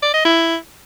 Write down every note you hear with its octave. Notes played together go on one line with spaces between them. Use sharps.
D5
D#5
E4